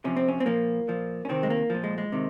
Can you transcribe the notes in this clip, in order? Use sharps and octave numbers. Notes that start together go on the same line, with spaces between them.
C3 F3 C#4
C4
C#4
C4
A#2 F3 A#3
A#2 F3
C#4
C3 D#3 C4
G#3
A#3
A#2 F3
G#3
G#3
C3 D#3